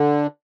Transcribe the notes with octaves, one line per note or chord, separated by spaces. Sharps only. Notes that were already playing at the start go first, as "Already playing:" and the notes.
Already playing: D3